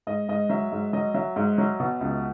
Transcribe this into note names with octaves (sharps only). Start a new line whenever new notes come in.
G#2 D#5
G#2 D#5
F#3 E5
G#2
F#3 D#5
F#3 E5
G#2
F#3
B2
C#2